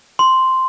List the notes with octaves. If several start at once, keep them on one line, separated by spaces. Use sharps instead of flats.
C6